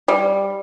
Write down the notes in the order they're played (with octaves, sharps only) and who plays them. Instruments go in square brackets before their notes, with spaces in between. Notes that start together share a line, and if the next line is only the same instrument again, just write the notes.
[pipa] G3